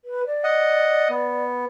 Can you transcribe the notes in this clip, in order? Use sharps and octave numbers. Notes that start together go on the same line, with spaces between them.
B4
D5
D#5 F#5
B3